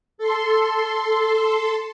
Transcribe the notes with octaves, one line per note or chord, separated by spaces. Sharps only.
A4 C6